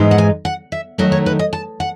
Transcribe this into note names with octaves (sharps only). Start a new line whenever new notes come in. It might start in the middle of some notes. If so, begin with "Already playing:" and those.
Already playing: G#2 E3 G#3 D#4
F#5
G#5
F#5
E5
D#3 F#3 A3 D#4 D#5
C#5
B4
D#5
A5
F#5